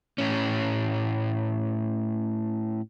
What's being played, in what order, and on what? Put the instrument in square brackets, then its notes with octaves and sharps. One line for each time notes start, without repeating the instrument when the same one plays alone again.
[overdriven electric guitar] A2 C#4